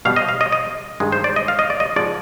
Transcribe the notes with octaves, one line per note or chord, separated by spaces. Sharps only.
B2 G3 F5
D#5
F5
D#5
D#5
G2 D#3 G#3
C5
D5
D#5
F5
D#5
D5
D#5
G#2 F3 G#3 D5